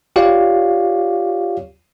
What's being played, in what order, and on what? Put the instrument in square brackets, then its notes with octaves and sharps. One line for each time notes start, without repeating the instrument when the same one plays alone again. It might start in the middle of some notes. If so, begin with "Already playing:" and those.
[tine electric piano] F4 G4 C#5 D5 F5